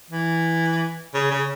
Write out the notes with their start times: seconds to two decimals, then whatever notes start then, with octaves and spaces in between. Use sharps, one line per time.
0.10 E3
1.14 C#3
1.30 C#3